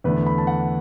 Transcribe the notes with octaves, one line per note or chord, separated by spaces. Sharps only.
E2 D3 A3 D4 B4
B5
A5
F#5